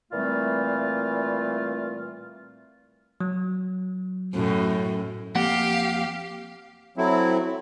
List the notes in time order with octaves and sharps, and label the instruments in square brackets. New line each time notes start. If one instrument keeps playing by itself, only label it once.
[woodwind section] A#2 E3 G3 A3 C4 F4
[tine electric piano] F#3
[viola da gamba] F#2 A2
[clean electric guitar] F2 A#3 F#5 [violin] G4 F5
[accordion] F#3 A3 C4 E4